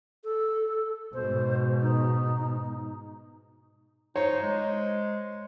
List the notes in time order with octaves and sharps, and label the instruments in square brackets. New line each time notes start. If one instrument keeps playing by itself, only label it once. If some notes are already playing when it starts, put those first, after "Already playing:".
[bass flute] A4
[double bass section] G#2 B2 [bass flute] C5
[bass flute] D#4
[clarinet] D#4 [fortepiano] C5 C#5
[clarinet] G#3